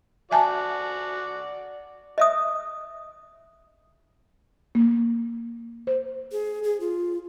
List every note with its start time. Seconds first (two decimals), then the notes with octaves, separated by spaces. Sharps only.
0.31 F#4 D5 E5 G#5 A5
2.18 D#5 E5 D#6
4.75 A#3
5.87 C5
6.32 G#4
6.63 G#4
6.80 F4